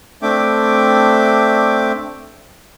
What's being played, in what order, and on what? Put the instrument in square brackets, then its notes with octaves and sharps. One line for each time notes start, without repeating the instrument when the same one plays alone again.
[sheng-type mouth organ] A3 C4 D4 E5 G5 D6